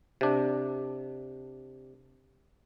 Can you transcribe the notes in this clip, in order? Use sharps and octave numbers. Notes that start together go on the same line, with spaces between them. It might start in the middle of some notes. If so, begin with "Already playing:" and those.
C3 D4